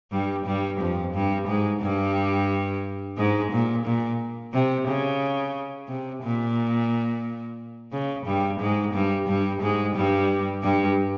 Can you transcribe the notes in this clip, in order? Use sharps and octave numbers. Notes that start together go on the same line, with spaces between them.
G2 G3
G2 G3
F2 F3
G2 G3
G#2 G#3
G2 G3
G#2 G#3
A#2
A#2
C3
C#3
C3
A#2
C#3
G2 G3
G#2 G#3
G2 G3
G2 G3
G#2 G#3
G2 G3
G2 G3